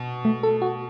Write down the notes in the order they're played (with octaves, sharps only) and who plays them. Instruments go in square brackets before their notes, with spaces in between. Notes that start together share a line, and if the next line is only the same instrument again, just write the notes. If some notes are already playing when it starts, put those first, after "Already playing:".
Already playing: [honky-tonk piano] B2
[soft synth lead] A3
A4
F#4